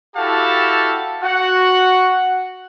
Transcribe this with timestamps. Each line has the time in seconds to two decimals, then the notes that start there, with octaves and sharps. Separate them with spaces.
0.16 E4 F#4 G4 A4 F5 A5
1.23 F#4 F#5